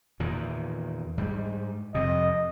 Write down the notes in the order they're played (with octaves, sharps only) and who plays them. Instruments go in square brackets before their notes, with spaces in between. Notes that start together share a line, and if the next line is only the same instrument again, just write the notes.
[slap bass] E2 A#2 D#3
G#2 G3
[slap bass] F2 C3 [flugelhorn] D#5